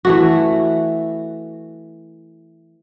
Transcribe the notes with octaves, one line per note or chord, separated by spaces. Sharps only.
E3 A3 F#4